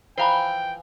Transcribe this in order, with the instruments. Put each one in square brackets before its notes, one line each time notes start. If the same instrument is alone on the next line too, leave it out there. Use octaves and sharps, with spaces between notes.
[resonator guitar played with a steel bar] E3 F3 A#5 [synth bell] C5 F5 G#5 [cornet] G5